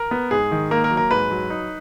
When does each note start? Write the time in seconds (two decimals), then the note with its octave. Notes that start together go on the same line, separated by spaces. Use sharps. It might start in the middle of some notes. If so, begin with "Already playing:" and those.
Already playing: A#4
0.11 B3
0.31 G#2 G#4
0.51 D#3
0.71 A#3 A#4
0.84 A#4
0.91 F#3
0.97 A#4
1.11 G#2 B4
1.31 F#3
1.50 D#4